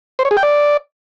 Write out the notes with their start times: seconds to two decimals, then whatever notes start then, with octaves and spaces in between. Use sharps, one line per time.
0.19 C5
0.25 C#5
0.31 G#4
0.37 G5
0.43 D5